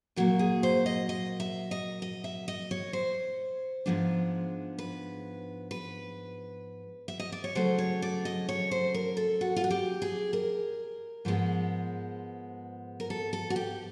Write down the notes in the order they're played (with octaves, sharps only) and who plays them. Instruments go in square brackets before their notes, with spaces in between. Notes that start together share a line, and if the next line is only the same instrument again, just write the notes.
[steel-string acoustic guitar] A#2 F#3 A#3 F#4
G#4
C5
D#5
D#5
E5
D#5
D#5
E5
D#5
C#5
C5
G#2 F3 G#3 B3 D4
B4
B4
E5
D#5
D5
C#5
C#3 F#3 A3 C5
C#5
D5
D#5
C#5
C5
A#4
A4
F#4
F4
F#4
G4
G#4
A#4
G#2 F3 G#3 B3
A#4
A4
A4
F#4
G4